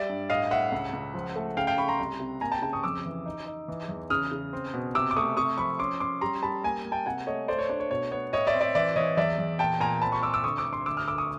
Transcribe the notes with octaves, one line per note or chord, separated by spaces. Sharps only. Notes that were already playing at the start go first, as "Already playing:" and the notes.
Already playing: G3 D5 E5
G2
A2 D#5 F5
A2 E5 F#5
C#2
C#2
F3
A3
C#3 F5 G5
F5 G5
C#3 B5 C#6
A#5 C6
C2
C3
A#3 G#5 A#5
G5 A5
C#3 G5 A5
C#6 D#6
F2 D6 E6
E3
D#4
D#4
E3
E2
C#3 D#6 F6
C#3
C4
B2
C3 D6 E6
D6
A3 C#6 D#6
C3 C#6 D#6
F3 B5 C#6
C#4 C6 D6
C#4 C6 D6
G3 A#5 C6
G3 A5 B5
A#3 G#5 A#5
A#3
G5 A5
C3 F#5 G#5
A3 C#5 D#5
A3 C5 D5
C#5
D4 C#5
C#5
B2 C#5
B3 C#5
A2 C#5 D#5
D5 E5
C4
D5 E5
E3 D5 E5
E3 C#5 D#5
E2 D5 E5
E2
A#2 G5 A5
A#2 G#5 A#5
C4 A5 B5
B5 C#6
C4 D6 E6
D6 E6
D2 C#6 D#6
D6 E6
D2
C6 D6
D2 D6 E6
D#6 F6
D2 D6 E6
C#6 D#6